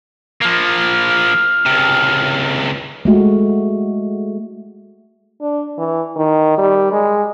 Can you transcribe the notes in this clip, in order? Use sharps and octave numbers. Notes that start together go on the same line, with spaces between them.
F3 A#3 F6
C#2 C3
G#3 A3 F#4
D4
E3
D#3
G3
G#3